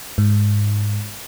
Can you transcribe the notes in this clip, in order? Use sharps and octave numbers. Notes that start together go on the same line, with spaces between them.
G#2